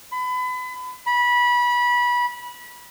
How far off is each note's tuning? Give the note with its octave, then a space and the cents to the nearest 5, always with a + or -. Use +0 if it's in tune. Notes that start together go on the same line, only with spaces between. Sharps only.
B5 +30
B5 -25